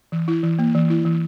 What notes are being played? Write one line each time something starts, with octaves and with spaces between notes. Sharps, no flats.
E3
E4
E3
A#3
E3
E4
E3